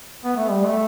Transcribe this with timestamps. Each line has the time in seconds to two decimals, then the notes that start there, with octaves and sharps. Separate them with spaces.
0.23 B3
0.36 A3
0.50 G3
0.64 A3